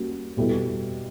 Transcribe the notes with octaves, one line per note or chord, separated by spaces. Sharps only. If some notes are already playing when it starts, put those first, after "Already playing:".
Already playing: G3 A#3 C#4 F#4
B2 G3 B3 E4 A4